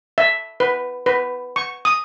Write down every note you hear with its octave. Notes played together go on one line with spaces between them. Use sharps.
E5
B4
B4
C#6
D#6